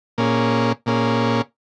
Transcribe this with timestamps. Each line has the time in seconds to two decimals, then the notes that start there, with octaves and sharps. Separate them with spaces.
0.18 A#2 A#3 C#4 G#4
0.86 A#2 A#3 C#4 G#4